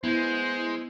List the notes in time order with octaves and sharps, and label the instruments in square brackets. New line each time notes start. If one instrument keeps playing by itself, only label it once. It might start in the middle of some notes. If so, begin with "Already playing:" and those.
[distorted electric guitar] G#3 [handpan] B3 [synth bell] E4 [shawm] C5